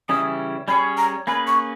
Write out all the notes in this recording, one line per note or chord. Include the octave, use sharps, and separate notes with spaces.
C#3 E3 G3 C#4 E4 D#6
G3 C#4 G#4 C#5 B5
A#5
A#3 C#4 G#4 B4 B5
C#6